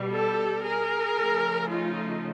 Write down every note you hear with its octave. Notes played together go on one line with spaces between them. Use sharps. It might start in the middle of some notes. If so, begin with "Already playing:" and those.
Already playing: B2 G3
G4 A4
G#4 A#4
C#3 F3 A3
D#4 F4